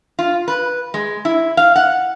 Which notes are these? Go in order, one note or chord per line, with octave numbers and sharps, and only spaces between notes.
F4
B4
G#3
E4
F5
F#5